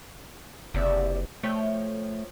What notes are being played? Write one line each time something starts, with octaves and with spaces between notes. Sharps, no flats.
F#1 C3 D5 E5
F3 A3 C#5 G5